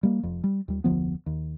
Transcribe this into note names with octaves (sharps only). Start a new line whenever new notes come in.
G3 A#3
F1 F2
G3
D#2 G3
F1 D2 F3 B3
D#2